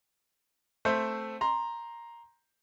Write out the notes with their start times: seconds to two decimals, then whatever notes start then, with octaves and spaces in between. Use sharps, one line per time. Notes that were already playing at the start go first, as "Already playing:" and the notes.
0.85 A3 C4 C5 E5 G6
1.41 A#5 C6